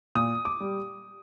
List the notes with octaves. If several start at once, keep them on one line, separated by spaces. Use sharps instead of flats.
A#2 D#6
D6
G3